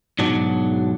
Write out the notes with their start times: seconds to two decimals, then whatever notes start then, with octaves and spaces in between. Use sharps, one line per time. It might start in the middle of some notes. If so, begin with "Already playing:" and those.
0.19 G#2 B2 F#3 D4